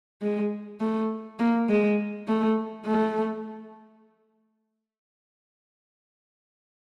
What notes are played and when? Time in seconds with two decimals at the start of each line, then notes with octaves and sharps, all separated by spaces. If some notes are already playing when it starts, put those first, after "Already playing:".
0.22 G#3
0.80 A3
1.39 A#3
1.69 G#3
2.27 A3
2.86 A3